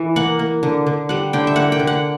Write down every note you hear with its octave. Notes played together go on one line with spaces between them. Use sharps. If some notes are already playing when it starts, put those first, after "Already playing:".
Already playing: E3
A#3 F#5
A#3
D3
D3
G3 F#5
D3 G5
E5
A#3 F#5
G5
D3
F#5